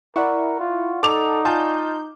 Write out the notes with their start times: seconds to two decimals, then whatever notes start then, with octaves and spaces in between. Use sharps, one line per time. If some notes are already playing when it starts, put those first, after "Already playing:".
0.16 E4 A#4 D5 F#5 C#6
0.59 F4
1.03 D#4 A4 D6 F7
1.45 F4 G#5 A5 G6